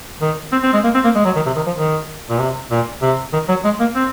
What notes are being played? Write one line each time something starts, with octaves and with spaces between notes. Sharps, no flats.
D#3
C4
C4
G#3
A#3
C4
A#3
G#3
F#3
D#3
C3
D#3
F3
D#3
A#2
C3
A#2
C3
D#3
F#3
G#3
A#3
C4